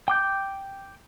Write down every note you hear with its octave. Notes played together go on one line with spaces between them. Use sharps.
G5 D6 G6